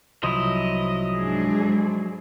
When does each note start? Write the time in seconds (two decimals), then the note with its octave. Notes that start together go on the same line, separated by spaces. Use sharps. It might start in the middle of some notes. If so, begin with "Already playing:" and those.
0.23 C2 F3 F#3 E4 D#5
1.15 G#2 D4 G#4